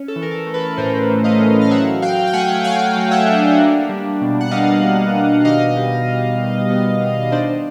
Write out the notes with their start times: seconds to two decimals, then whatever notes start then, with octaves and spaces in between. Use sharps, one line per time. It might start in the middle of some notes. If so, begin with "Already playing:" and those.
Already playing: C#4
0.08 A4
0.16 E3
0.22 A#4
0.31 A4
0.47 A3
0.54 A4 B4
0.78 A2 A#4 C5
1.09 E3
1.24 D#5 F5
1.40 C#4
1.61 F5
1.71 F#3 E5 F#5
2.02 F#3 F5 G5
2.27 G5
2.33 A3 F#5 G#5
2.64 F#3 F5 G5
2.96 F#3
3.11 E5 F#5
3.27 D4
3.59 A#3
3.89 G3
4.21 B2
4.41 F#5
4.51 G3 D#5 F5
4.83 B2
5.15 B2
5.45 D#3 D#5 F5
5.76 G3
6.08 G3
6.38 D#3
6.70 B3
7.00 B3
7.32 D4 C5 D5